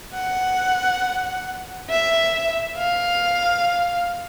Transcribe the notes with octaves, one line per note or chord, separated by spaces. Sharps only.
F#5
E5
F5